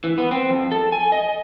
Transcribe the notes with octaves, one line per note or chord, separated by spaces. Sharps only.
E3
B3
C4
F2
A4
G#5
D#5